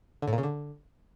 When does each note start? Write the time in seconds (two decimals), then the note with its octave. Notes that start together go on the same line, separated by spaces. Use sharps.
0.22 D3
0.28 A2
0.33 A#2
0.38 C#3
0.43 D3